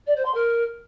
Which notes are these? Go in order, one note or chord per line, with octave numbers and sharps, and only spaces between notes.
D5
C5
C6
A#4